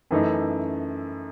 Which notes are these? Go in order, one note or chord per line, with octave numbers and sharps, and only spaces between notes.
F#2 E3 A3 D#4